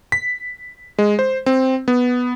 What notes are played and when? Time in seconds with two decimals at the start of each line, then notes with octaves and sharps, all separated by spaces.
0.12 B6
0.99 G#3
1.19 C5
1.46 C4
1.88 B3